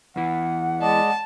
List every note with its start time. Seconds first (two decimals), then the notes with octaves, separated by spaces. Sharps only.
0.16 E2 E3 F#5
0.81 G#3 D5 D#5 A5